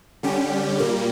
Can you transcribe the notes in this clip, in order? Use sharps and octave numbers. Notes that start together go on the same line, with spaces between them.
D3 G3 C#4 G4
A#2 G3 A#3